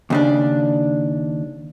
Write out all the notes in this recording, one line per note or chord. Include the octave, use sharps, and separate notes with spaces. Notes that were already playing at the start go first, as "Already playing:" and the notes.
D#2 C#3 D4